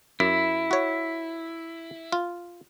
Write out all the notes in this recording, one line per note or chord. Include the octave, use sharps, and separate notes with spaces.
F#2 E4
F#4 C#5
F4